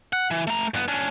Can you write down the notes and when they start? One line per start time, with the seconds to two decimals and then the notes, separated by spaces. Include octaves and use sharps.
0.13 F#5
0.31 E3
0.47 A3 A#5
0.74 G2 B3
0.88 C#4 D4